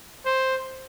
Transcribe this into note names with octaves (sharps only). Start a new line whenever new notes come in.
C5